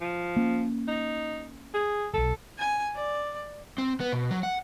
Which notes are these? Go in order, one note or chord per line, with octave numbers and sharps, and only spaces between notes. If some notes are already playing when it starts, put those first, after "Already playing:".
F3
A#3 C#4
D#4
G#4
E1 B1 A4
G#5
D5
C4
B3
B2
F#3
F#5